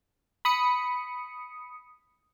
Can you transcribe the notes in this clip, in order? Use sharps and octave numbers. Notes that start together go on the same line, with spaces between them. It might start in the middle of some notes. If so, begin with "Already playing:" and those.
B5 D#6 C#7